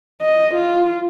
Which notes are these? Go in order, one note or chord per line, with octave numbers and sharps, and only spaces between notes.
D#5
F4